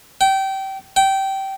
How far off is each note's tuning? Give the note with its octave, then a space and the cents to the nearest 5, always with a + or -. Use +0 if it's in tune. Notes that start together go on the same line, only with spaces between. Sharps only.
G5 -25
G5 -20